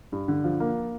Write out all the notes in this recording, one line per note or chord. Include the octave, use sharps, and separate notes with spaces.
G2
D3
F3
A#3